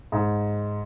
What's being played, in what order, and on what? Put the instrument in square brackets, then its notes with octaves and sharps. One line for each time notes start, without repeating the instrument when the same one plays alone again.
[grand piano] G#2